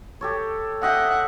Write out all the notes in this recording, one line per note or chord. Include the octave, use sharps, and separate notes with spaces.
G4 A4 C#5
D#5 E5 F#5 G5